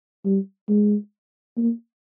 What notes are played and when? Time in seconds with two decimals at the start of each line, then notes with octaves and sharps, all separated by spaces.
0.25 G3
0.69 G#3
1.57 A#3